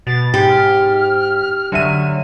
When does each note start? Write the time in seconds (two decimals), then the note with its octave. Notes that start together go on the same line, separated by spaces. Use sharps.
0.07 B2 A6
0.34 G#2 G4
0.49 F6
1.72 D3 F#3 E5 D#7